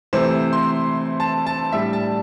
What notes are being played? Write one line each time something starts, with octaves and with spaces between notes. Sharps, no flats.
C3 E3 A3 C5
C6
A5
A5
A2 G3 D4 E5
A5